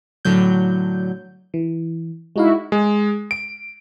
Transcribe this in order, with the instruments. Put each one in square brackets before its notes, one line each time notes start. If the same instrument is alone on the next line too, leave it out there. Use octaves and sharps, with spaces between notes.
[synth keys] A2 D3 F#3 G6
[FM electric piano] E3
[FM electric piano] G#3 D#4 F5 [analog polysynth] E4 F#4
[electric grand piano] G#3
D7